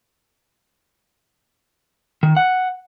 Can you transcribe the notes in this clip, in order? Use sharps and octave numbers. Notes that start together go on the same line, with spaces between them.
D#3
F#5